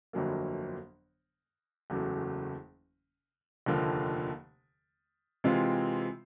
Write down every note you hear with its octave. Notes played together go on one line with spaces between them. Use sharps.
G1 F2 D3 F#3 A#3
F#1 E2 C#3 F#3 A3
F1 D#2 D3 F3 A#3
C3 E3 G#3 C4 F4